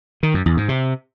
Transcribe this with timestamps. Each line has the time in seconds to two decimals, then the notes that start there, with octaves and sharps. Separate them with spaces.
0.23 D#3
0.34 F#2
0.46 E2
0.57 G#2
0.69 C3